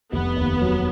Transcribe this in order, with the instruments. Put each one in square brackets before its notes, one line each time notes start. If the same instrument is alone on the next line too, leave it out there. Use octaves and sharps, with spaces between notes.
[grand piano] F1 [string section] B3
[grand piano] D#2
F#3